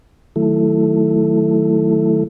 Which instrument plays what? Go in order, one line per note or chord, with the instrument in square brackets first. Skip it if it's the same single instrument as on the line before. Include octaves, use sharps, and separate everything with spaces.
[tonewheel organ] D#3 F#3 A3 E4 A4